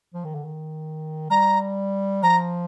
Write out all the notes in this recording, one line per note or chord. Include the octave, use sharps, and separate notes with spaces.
F3
D#3
D3
D#3
G3 A#5
F3 A#5